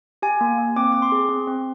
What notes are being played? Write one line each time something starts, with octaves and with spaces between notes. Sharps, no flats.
G4 G#5
A#3
A#3
C4 D6
C4 D6
C6
G#4
C4
C4